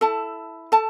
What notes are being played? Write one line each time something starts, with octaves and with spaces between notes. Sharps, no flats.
E4 A4 A5
A4 A5